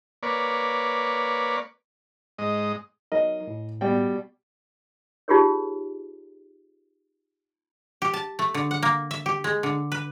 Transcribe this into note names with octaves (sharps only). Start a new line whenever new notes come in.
A#3 B4 C#5 D5
G#2 D#5
F#3 D#4 A#4 D#5
A2
B2 G3 G5
D#4 F4 G4 G#4 A#4 C#5
G4
A5
A3
D3
F#5
A#3
E5
G4
G#3
D3
B4